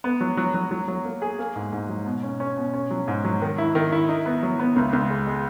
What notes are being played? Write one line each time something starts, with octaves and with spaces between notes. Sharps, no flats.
B3
F#3
F#3
F#3
F#3
F#3
A#3
G#4
A#3
G#2
G#2
F#3
B2
C#4
C#4
B2
C#4
F#3
G#2
F#3
D#3
E4
D#3
E4
D#4
B3
F#3
B3
C#2
C#2
G#3
G#3